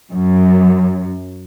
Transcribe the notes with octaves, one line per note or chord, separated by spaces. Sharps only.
F#2